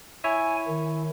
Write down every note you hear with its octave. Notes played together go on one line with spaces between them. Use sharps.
E4 C#5 E5 G#5
D#3